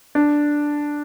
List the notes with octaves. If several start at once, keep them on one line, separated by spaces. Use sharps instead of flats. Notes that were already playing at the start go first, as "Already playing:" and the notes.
D4